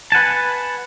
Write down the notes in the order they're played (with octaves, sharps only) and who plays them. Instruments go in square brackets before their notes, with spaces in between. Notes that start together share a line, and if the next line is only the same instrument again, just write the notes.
[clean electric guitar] B4 F#5 G#5 A5